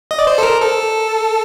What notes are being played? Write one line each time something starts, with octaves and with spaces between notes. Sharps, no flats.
D#5
D5
C5
A4
A#4
A4